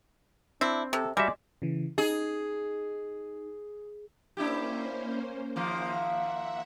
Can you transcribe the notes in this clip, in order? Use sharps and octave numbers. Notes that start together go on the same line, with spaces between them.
C4 D4 E4
C3 A4
G3 G#3 F#4 D5 E5
C#3 E3
D#4 G#4
A#3 C#4 D4 E4 G4 C5
D#2 F3 A#3 E5 F#5